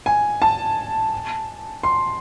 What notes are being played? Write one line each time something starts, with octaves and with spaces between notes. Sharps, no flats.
G#5
A5
C6